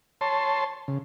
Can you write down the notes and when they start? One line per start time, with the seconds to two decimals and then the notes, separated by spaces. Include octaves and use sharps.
0.21 C#5 A5 C6
0.88 C#3